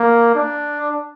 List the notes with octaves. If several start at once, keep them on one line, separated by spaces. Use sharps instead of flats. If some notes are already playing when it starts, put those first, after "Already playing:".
Already playing: A#3
D4